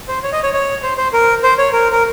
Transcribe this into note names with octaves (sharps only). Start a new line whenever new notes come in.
C5
C#5
D#5
C#5
C#5
C5
C5
A#4
C5
C#5
A#4
A#4